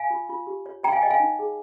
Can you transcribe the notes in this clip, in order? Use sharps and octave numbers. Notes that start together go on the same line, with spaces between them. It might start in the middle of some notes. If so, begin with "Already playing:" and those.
Already playing: F5 G#5
F4
F4
G4
C#5
C#5 G5 A#5
F5 G#5
C#5 D#5 G5
F5 G#5
D#4
G#4